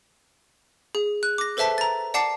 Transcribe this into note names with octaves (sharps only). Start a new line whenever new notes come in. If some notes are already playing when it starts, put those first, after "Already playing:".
G#4
F#6
D6 A#6
A4 B4 C5 E5 A5 B6
A#5 A6
D5 F#5 A5 D6 C7